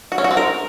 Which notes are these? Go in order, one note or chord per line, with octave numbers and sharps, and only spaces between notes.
F#4
C#4
F#4
C4
A#4